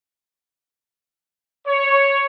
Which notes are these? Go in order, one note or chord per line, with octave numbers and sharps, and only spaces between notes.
C#5